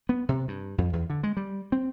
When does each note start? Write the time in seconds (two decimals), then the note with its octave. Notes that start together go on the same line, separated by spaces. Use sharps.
0.09 B3
0.29 C3
0.48 G2
0.78 F2
0.93 E2
1.10 D3
1.23 G#3
1.37 G3
1.72 C4